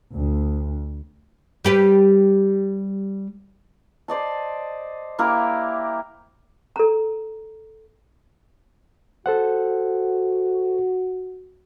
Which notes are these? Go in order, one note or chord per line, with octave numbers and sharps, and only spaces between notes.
D2
G3 G4 B4
C5 D5 D#5 A5
A#3 E4 G4 A#4
A4 A#5
F#4 A4 C5 F#5